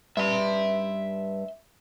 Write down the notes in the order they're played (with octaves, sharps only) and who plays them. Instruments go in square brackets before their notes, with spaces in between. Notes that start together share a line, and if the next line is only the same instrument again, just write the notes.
[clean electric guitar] G2 [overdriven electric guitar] E5 C6